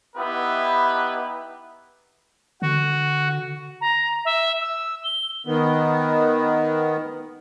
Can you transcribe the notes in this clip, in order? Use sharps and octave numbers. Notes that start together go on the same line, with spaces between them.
B3 D#4 E4 G4 B4
D3 F#4
A#5
E5
E6
G7
D#3 B3